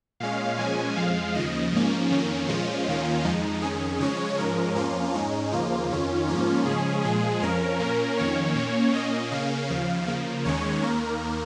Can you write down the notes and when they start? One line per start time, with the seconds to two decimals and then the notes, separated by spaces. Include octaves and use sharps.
0.20 A#2 G#3 C#4 F5
0.58 A#2 F3 G#3 C#4 G#5
0.96 F2 F3 G#3 F5
1.34 D#2 C#3 F3 D#5
1.72 G#2 F3 A#3 C#4
2.11 F2 D#3 A#3 C#4
2.48 A#2 F3 G#3 C#4 F4
2.87 D#2 D#3 A#3 C#4
3.24 F2 F3 G#3 D#4
3.62 F2 D#3 C#4 G#4
4.00 C#3 F3 G#3 C#4 C#5
4.37 G#2 F3 G#3 C#4 A#4
4.76 F2 F3 A#3 C#4 F4
5.14 G#2 G#3 C#4 D#4
5.52 D#2 C#3 F3 A#3 F4
5.90 F2 D#3 C#4
6.27 G#2 F3 A#3 C#4 F4
6.65 C#3 F3 G#3 C#4 G#4
7.04 A#2 F3 G#3 G#4
7.41 F2 F3 C#4 A#4
7.79 A#2 A#3 C#4
8.17 F2 D#3 A#3 C#4 C#5
8.55 A#2 A#3 C#4
8.93 A#2 A#3 C#4 D#5
9.31 C#3 A#3 C#4 F5
9.70 D#2 C#3 F3
10.07 C#3 F3 A#3
10.44 D#2 D#3 G#3 C#4 C#5
10.83 D#2 D#3 A#3 A#4